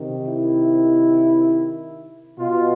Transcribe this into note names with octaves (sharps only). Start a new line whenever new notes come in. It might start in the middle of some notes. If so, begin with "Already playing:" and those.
Already playing: C3 D#3
E4
B2 F4